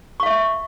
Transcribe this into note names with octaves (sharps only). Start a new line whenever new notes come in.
E5 F5 C#6